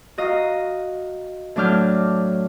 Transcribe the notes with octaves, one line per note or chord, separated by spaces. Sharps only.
F#4 D#5 F5 A#5
A2 F#3 D4 D6 F6 G6